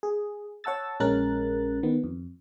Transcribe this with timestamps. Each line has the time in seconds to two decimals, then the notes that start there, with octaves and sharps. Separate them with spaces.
0.03 G#4
0.64 C#5 F#5 A5 E6 A6
1.00 A#1 G#3 C#4 A#4 F#6 A6
1.83 D#3 B3
2.04 F2